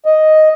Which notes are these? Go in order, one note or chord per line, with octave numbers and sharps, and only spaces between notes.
D#5